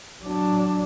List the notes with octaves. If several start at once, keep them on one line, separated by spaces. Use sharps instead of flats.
F#3 D4